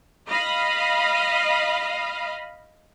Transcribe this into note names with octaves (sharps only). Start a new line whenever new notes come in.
D#5 F5 B5